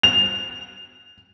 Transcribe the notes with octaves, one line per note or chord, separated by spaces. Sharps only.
F7